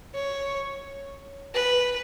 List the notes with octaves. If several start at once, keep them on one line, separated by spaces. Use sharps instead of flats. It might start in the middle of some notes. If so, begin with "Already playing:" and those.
C#5
B4